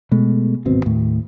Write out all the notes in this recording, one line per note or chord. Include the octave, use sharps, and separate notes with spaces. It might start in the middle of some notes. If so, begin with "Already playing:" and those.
B2 G#3 A3
D1 G#1 B2 C4
D#2 A2